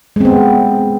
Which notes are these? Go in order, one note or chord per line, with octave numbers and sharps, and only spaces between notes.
G#3 B3 C4